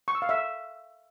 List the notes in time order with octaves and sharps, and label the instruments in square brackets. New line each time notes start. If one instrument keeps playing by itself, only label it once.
[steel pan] C#6
E6
F5
E5